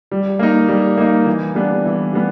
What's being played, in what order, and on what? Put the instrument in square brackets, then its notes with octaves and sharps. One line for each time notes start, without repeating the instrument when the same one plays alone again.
[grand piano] G3
A#3 D#4
G3
A#3 D#4
E3
G3 B3 D4
E3
G3 B3